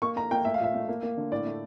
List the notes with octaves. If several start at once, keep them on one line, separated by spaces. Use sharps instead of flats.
A#3 C#6
A#3 A#5
A#3 G5
A3 E5
F5
A#2 E5
A3
A#3
A#3
D3
A2 D5
A3